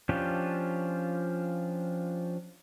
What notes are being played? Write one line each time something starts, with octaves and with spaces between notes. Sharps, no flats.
F3 C#4 D4 F4 G4